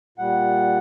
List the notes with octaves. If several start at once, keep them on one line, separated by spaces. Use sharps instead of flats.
A#2 G3 F#5